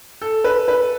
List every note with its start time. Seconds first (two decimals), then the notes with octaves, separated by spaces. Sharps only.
0.22 A4
0.44 B4
0.68 B4